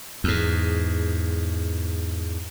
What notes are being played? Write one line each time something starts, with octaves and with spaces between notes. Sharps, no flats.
E2 G#2